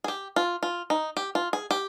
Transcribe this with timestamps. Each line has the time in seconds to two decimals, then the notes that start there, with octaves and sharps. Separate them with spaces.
0.04 G#4
0.08 G4
0.36 F4
0.63 F4
0.90 D#4
1.17 G4
1.35 F4
1.53 G#4
1.71 G4